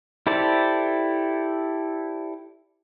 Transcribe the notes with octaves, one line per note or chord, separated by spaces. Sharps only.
E4 G4 A4 C5 D5